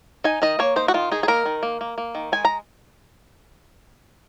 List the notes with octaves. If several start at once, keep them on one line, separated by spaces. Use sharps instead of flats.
D#4 G#5
D#3 D#5
A#3 C#5
D#4 C5
F#4
D#3 F4
D#4 G#4
G#4
A#3 A#4
D#3
A#3
A#3
A#3
D#3
G#3 G#5
A#5